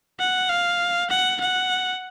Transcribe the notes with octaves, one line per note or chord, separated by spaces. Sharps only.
F#5
F5
F#5
F#5